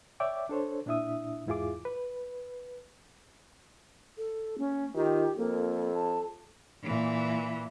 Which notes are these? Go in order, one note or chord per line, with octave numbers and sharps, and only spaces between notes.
C#5 D5 E5 G5 D6
D4 A4 C5 C#5
A#2 D4 E4 E5 D#6
E2 G#2 E4 F4 G#4 D6
B4
A4
A#3 C#4
D#3 F4 G4
F2 A#3 A4
A5
A#2 E3